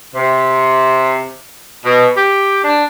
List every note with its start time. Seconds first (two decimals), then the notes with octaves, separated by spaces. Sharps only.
0.16 C3
1.85 B2
2.17 G4
2.64 D4